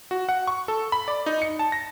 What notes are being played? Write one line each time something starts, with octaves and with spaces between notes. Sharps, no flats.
F#4
F#5
C#6
A4
B5
D5
D#4
C#7
A5
A#6